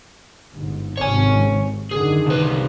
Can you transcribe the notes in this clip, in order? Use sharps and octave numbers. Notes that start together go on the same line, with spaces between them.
G1 G#2
G#1 G#2 C3 C#5 G#5
F#2 D3 D#3 G#4
C2 B4